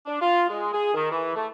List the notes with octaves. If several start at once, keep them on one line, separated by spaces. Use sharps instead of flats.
D4
F4
G#3
G#4
D#3
E3
A3